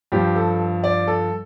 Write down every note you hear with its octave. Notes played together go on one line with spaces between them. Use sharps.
G2 F3 G4
A4
D5
A4